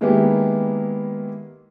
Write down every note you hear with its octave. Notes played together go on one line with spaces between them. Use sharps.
D#3 G#3 A#3 B3 E4 G4